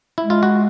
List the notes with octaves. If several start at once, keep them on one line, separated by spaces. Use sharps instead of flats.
E4
G#3
F4
F#4